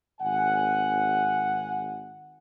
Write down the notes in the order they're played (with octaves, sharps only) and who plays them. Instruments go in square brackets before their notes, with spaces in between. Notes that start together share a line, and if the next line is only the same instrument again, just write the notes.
[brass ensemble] G#1 F#5 G#5